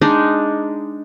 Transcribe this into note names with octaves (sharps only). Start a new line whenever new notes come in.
G#3 D4 D#4